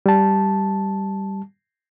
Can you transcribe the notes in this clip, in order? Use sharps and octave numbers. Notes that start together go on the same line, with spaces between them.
G3 A5